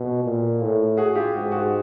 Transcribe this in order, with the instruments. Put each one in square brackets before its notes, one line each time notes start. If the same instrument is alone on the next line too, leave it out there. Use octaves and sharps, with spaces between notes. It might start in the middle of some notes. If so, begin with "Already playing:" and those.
Already playing: [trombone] B2
A#2
A2
[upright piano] F#4 G#4
F4 G4
[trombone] G#2 [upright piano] F#4 G#4
[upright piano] F#4 G#4